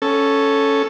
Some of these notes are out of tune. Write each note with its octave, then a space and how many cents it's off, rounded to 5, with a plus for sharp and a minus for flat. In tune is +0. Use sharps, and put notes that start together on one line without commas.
C#4 +0 A4 +0